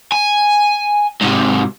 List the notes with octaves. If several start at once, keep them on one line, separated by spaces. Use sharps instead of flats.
G#5
G#2 C3